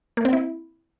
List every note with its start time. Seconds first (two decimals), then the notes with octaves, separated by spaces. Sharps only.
0.17 A#3
0.25 C4
0.33 E4